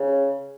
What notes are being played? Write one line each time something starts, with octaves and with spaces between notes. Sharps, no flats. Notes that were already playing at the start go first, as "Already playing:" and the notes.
Already playing: C#3